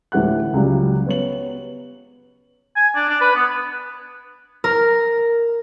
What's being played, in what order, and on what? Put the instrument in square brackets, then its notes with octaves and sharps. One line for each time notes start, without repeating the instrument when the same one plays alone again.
[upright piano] D2 A2 E3 G4 F#5 F#6
C#2 C#3 F#3 G3
B3 C#5 F#7
[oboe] G#5
D4
D4
B4
B3
[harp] A#4